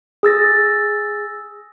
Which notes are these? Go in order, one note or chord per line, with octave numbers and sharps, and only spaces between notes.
G#4 E6 A6 A#6